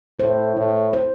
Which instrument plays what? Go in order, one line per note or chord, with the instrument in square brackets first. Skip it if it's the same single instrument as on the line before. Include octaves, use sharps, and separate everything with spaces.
[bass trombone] A2 [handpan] C5
[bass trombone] A2 [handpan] E4
[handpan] C5